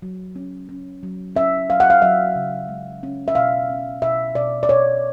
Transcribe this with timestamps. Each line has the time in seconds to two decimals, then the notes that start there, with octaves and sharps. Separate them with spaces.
0.02 F#3
0.36 C#4
0.69 C#4
1.03 F#3
1.35 C#4 E5
1.69 F#3 F5
1.80 F#5
1.90 F5
2.02 F#3 E5
2.35 C#3
2.69 G#3
3.03 C#4
3.28 E5
3.35 B2 F5
3.70 C#4
4.02 B2 E5
4.35 B2 D5
4.63 D5
4.69 B2 C#5